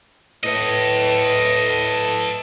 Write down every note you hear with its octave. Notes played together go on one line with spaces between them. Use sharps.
A2 A4 B4 D#5